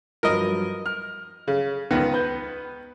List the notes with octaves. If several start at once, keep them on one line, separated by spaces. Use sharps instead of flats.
G2 F3 F#3 A#4 D#5
F6
C#3
C#2 D#3 B3
B4 G6